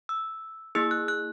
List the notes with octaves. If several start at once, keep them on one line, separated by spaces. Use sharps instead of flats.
E6
A#3 E4 G#4 E6
F#6
F#6